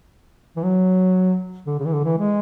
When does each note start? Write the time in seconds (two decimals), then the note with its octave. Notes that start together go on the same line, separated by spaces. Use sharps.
0.57 E3
0.64 F#3
1.66 D3
1.79 C#3
1.85 E3
1.92 D3
2.04 E3
2.18 G#3